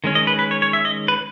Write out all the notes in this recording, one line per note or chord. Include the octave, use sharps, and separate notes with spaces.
D#3 G#3 C#4
D#5
B4
B4
C#5
C#5
E5
D#5
B4